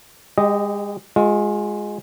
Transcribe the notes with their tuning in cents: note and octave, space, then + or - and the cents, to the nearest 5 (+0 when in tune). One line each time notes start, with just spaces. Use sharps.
G#3 -35 G4 +0 D#5 +0
G#3 +0 F4 +35 E5 +0